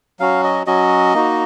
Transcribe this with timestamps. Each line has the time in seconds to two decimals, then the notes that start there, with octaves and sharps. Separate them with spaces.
0.19 F#3 C#4 F#4 F5
0.43 D#5
0.67 F#3 C#4 F#4 D#5
1.14 A#3 D#4 F#4